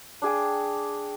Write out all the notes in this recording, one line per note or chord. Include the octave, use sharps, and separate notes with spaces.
D4 G#4 G5